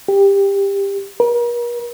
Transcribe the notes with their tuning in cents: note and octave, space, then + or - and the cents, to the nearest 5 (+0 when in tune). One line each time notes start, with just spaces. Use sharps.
G4 +15
A#4 +45